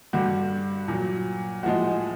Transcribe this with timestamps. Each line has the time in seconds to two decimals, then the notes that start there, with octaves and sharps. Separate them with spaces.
0.13 G2 D3 G3 F#4
0.88 A#2 F#3
1.63 A2 F3 G#3 F#4